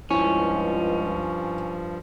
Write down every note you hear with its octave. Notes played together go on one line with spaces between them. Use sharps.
C#2 G2 F3 C#4 E4